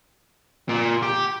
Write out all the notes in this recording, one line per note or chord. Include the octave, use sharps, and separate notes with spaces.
A#2
G4